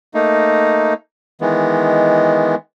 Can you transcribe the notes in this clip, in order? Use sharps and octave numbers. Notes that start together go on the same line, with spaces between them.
A3 A#3 D#4
D#3 E3 G#3 B3